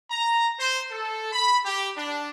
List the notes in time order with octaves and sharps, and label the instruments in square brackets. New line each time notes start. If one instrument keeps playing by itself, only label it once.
[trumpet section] A#5
C5
A4
B5
G4
D4